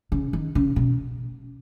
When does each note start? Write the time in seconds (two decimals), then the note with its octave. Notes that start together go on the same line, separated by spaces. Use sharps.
0.12 C#3
0.33 D#3
0.55 C#3
0.76 B2